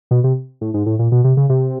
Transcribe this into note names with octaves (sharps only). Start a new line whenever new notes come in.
B2
C3
A2
G#2
A2
A#2
B2
C3
C#3
C3